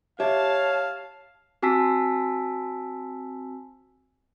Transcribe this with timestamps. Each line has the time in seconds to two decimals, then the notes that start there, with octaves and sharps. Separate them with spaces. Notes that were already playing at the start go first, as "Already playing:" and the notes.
0.20 G4 C#5 E5 F5 A5
1.62 C4 F#4 G#5 A5 E6 B6